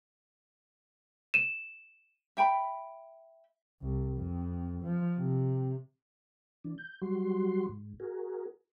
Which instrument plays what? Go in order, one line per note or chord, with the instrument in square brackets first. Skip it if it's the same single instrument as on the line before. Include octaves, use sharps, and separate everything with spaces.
[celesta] D#7 E7
[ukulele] E5 G5 A5 B5
[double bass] C2
F2
F3
C3
[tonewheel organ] E3 D4
G6
F#3 G3 F#4 C6
G#2
F#4 G#4 A#4